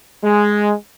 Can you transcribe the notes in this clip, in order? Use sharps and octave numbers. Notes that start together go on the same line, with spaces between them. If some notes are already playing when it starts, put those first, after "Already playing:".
G#3